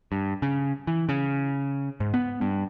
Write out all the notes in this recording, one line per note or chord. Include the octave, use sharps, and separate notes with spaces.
G2
C#3
E3
C#3
G#2
B3
G2